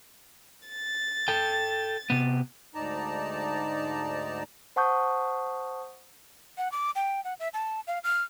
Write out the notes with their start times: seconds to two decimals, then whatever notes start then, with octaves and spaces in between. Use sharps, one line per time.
0.68 A6
1.28 A4 G5
2.10 C3 B3
2.75 D2 G#2 D#4 D5 A5 A#5
4.76 C5 F#5 A5 C#6 D#6 G6
6.58 F#5
6.72 D6
6.95 G5
7.24 F#5
7.40 E5
7.54 A5
7.87 F5
8.04 F6